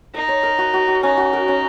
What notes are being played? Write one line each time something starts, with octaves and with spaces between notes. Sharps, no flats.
D#4 A#4
C#5
A#4
F#4
F#4
F#4
C#4 D#4
F#4
A#4
C#4